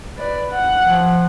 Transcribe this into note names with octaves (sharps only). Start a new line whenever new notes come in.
B4 D5
F#5
F3